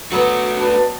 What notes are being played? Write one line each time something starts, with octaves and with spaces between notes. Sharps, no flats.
F#3 A3 B3 F#4
D4 B4